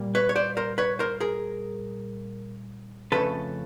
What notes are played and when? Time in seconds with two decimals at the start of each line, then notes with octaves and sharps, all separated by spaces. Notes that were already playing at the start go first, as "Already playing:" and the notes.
Already playing: A#2 G3 A#3
0.15 B4 C#5
0.29 C#5
0.36 C5 D5
0.57 A#4 C5
0.78 B4 C#5
0.99 A#4 C5
1.20 G#4 A#4
3.12 F2 C#3 F3 A3 C#4 A4 B4